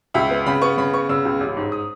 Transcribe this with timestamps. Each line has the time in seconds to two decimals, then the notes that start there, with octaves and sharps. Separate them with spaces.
0.14 C#2 E5
0.31 B3
0.46 C#3 B5
0.62 B3 C#6
0.78 C#3 B5
0.93 B3 C#6
1.09 C#3 E6
1.25 C#2
1.40 A1
1.57 G#2
1.72 D#6